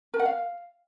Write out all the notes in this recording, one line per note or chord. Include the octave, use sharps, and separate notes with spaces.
A#4
F#5
F5